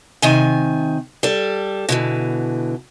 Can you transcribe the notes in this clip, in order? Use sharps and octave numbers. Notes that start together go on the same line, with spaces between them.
C3 D#3 G#5
G3 A4
B2 D3 E3